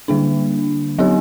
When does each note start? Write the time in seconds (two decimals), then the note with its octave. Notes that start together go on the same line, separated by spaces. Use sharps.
0.08 D3 G3 A#3 D4
0.99 F#3 B3 D#4 G4